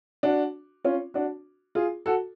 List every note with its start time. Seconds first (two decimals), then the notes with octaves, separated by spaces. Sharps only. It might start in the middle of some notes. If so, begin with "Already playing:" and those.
0.23 D4 F#4
0.84 C#4 F4
1.14 D4 F#4
1.75 F4 G#4
2.06 F#4 A4